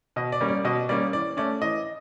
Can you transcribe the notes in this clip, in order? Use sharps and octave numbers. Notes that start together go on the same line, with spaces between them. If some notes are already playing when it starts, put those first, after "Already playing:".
B2 D#5
D5
G3 A#3 C#4
D5
B2 D#5
G3 A#3 C#4 D5
E3 D5
A3 C#4 D5
E3 D#5